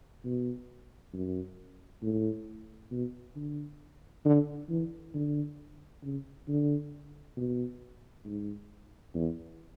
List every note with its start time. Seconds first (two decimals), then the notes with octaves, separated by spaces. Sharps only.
0.24 B2
1.13 F#2
2.02 A2
2.91 B2
3.36 D3
4.25 D3
4.69 E3
5.14 D3
6.03 C#3
6.48 D3
7.37 B2
8.25 G#2
9.14 E2